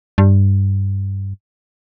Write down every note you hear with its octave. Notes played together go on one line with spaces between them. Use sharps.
G2